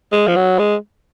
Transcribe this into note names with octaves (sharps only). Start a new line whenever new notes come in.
G#3
F3
F#3
G#3